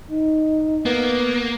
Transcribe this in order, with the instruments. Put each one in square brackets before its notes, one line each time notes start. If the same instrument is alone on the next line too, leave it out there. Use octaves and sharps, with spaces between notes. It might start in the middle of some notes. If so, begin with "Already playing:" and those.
[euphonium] D#4
[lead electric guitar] A#3 [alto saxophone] B3